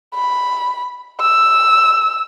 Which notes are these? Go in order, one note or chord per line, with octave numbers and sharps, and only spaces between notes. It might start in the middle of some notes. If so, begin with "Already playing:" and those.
B5
E6